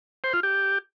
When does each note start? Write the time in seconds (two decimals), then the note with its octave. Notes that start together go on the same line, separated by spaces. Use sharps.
0.24 C5
0.33 F4
0.43 G4